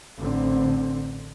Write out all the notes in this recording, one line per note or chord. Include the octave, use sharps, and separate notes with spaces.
A1 D3 C4